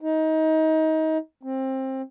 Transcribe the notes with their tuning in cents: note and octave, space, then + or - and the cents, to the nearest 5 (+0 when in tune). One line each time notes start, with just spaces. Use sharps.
D#4 +25
C4 +20